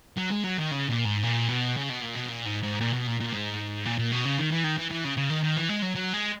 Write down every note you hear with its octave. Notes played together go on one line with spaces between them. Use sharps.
F#3
G#3
F#3
D#3
C#3
A#2
G#2
A#2
B2
C#3
B2
A#2
B2
A#2
G#2
G#2
A#2
B2
A#2
A#2
G#2
A#2
A#2
B2
C#3
D#3
E3
D#3
E3
E3
C#3
C#3
D#3
D#3
E3
G#3
F#3
F#3
G#3